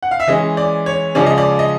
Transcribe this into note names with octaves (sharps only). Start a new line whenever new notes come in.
F#5
F5
E5
E3 G#3 C#4 D#5
D5
C#5
C#3 F3 G#3 C#4 D5
D#5
D5
D#5